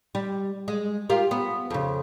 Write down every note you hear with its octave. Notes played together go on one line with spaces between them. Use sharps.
G3
G#3
F4 G4 A#4
B3
F2 C#3